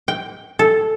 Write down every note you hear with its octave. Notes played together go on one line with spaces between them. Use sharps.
G5
A4